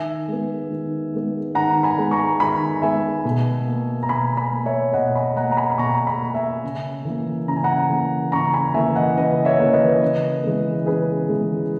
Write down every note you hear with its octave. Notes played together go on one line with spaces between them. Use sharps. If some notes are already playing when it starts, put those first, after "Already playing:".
Already playing: D#3 E5 G#5
G#3 B3
D#3
G#3 B3
D#3 F#5 A#5
G#5 B5
G#3 B3
A#5 C#6
D#3 G#5 B5
G#3 B3 E5 G#5
B2
A#3
A#5
B2 G#5 B5
G#5 B5
A#3
C#5 E5
B2 D#5 F#5
G#5 B5
A#3 F#5 A#5
A#5
G#5 B5
B5
B2 A#5 C#6
G#5 B5
A#3
E5 G#5
C#3
E3 A#3
C#3 A#5
G#5
F#5 A#5
E3 A#3
C#3 A#5 C#6
G#5 B5
E3 A#3 E5 G#5
D#5 F#5
C#3 B4 D#5
C#5 E5
E3 A#3
B4 D#5
C#3
E3 G#3 B3
C#3 G#4 B4
E3 G#3 B3